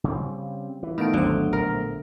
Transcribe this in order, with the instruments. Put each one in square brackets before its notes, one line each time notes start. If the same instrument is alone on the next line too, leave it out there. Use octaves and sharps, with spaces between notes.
[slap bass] C#3 G3 C4
E3
[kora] D#3 [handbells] A3 B3 D7 [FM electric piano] D#4 F5 A5
[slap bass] G#1 D#2 [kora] D3 [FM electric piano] F#3 C5
[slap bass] A#1 [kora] A#4